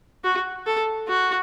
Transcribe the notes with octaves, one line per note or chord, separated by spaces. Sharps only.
F#4
A4
F#4